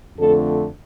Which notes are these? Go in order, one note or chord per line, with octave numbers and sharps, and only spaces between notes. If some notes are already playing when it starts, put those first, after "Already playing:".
F2 D3 A3 A4